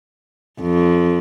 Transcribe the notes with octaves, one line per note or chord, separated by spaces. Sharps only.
F2